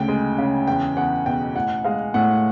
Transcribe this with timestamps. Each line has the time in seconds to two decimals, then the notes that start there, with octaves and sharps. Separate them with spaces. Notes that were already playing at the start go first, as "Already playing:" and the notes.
Already playing: D2 C#3 G5
0.08 G#3
0.38 C#3
0.67 E2 G5
0.96 E2 F#5
1.26 B2 G5
1.55 A1 F#5
1.84 G#3 F5
2.14 A2 F#5